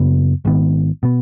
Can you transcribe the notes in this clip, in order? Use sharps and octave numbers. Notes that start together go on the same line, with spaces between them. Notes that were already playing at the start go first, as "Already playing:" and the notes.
Already playing: F#2 C#3 B3
G#1 G#2 D#3 B3
B2 B3